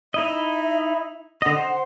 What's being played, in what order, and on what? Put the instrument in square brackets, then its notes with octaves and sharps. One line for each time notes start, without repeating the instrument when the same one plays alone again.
[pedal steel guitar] D#4 E4 D#5 [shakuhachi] E5
[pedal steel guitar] D3 D#5 [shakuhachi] F#5
[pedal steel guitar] C5